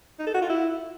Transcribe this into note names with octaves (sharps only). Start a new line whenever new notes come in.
D#4
A4
F#4
F4
E4